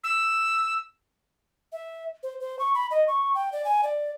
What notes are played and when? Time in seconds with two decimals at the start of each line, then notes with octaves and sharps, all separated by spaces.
0.04 E6
1.72 E5
2.23 C5
2.40 C5
2.59 C#6
2.75 B5
2.91 D#5
3.08 C#6
3.35 G5
3.52 D5
3.65 G#5
3.83 D5